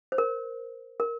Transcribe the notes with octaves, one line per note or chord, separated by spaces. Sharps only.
C5
A#4
A#4